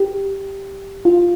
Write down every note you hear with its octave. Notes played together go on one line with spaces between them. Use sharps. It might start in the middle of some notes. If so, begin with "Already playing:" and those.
Already playing: G4
F4